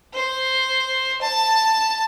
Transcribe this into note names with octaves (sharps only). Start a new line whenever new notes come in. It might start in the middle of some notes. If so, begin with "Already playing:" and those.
C5
A5